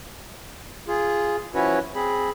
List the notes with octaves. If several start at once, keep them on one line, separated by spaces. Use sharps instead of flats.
F4 G#4
F3 C#4 E4 F#4 B4 C#5
C4 G#4 B5